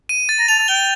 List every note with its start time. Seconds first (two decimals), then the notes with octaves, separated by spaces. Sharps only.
0.09 D#7
0.29 A6
0.39 A#5
0.48 A5 F7
0.59 A5
0.68 G5 G7